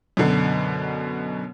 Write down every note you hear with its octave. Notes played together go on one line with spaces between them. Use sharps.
F#2 B2 D3